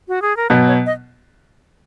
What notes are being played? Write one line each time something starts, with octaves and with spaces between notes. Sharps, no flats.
F#4
G#4
A#4
B2 F#3 B3 B4
C#5
D#5